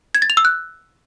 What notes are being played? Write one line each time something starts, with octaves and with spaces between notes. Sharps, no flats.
G#6
A6
F7
E6
F#6